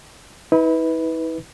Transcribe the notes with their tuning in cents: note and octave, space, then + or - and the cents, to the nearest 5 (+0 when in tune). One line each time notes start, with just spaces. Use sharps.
E4 -45 B4 +0